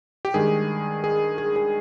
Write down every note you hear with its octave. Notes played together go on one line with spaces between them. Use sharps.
G4
G2 D#3 G#3 G#4
G#4
G#4
G#4